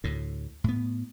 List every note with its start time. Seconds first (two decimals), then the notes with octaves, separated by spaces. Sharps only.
0.04 D2 A2
0.64 A2 B3